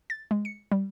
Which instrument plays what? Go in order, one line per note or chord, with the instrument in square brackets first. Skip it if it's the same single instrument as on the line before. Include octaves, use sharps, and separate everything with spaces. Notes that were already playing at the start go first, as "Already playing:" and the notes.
[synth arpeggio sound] A6
G#3
C#7
G3